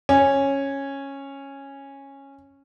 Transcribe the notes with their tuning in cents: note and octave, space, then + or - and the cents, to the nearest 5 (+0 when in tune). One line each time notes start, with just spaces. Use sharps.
C#4 -10